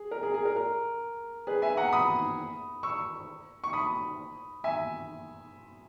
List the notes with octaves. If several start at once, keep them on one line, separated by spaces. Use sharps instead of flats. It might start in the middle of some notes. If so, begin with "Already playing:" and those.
Already playing: G#4
A#4
G#4
G#4
A#4
A#4
G#4 B4
E5 G#5
F#5 A#5
B5 D#6
C#6 E6
C#6
B5 D#6
E5 G#5